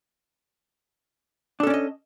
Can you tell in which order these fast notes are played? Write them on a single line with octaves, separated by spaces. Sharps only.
D4 A4 C#4 D5 D#5